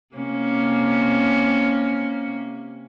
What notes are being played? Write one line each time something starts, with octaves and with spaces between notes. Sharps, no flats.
C3 A#3 C#4